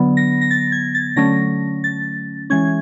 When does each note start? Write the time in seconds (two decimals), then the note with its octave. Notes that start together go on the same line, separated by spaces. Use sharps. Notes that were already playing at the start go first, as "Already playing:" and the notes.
Already playing: D3 F#3 B3
0.17 A#6
0.41 A#6
0.51 A6
0.72 G#6
0.95 A6
1.16 D3 F#3 A3 C#4 A#6
1.84 A6
2.50 E3 G#3 C#4 G#6